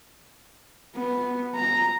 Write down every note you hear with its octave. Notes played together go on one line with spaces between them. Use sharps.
B3
A#5